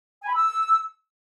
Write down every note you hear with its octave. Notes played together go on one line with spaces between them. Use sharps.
G#5
B5
E6